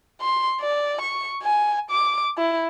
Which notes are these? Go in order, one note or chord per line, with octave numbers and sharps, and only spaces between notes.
C6
D5
C#6
G#5
D6
E4